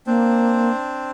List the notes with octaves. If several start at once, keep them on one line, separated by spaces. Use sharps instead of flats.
A#3 C4 D4 C5